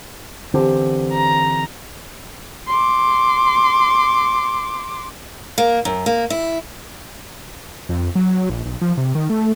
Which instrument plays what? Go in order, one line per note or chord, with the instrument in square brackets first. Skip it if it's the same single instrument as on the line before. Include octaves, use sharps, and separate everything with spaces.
[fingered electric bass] D3 E3 [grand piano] C4 G4
[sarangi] A#5
[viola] C6 D6
[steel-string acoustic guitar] A#3
F#2
A#3
E4
[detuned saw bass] F2
F#3
A#1
B1
F3
C3
D#3
A3